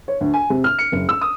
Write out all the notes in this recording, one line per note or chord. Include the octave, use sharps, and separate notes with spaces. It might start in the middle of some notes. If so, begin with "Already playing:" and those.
C#5
D2
G#5
C3
F6
C#7
F#1
E6
D#6